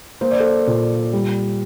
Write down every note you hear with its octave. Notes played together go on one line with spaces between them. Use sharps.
A#3 C5
D5
A4 C5
A#2
G3